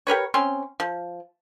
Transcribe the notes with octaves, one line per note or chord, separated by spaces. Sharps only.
G4 A#4 B4 C#5
C4 C#4 C6
F3